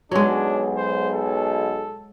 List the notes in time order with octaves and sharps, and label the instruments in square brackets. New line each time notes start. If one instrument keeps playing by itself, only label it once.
[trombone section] B1 G#4 [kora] F#3 G#3 [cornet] D4
[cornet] C5
A4